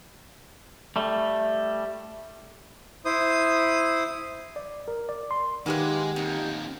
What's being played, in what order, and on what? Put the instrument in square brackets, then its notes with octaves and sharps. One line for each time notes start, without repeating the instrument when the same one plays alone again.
[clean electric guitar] G3 A3
[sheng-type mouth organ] E4 C5 D#6
[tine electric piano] D5
A#4
D5
C6
[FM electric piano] D#3 [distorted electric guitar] G#3 [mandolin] A#3 B4 F#6 [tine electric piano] G4 F#5
[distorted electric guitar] F2 A#3 [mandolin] D#4